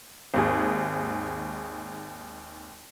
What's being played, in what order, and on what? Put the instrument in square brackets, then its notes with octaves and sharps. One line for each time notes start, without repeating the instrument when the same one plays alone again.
[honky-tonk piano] G#1 D#2 G#4